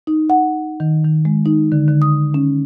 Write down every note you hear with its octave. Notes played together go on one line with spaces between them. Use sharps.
D#4
F#5
D#3
D#3
G#3
D#4
D3
D3
D#6
C#4